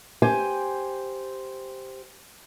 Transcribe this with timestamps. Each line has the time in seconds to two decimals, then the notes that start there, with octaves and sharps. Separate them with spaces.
0.22 G4 C5 G#5